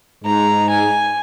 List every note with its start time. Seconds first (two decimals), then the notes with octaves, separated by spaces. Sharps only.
0.24 G#2 G#3 D#4 A#5
0.69 G#5